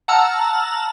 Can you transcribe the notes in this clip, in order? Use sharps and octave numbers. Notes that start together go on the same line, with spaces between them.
F#5 A5 A#5 E6 F6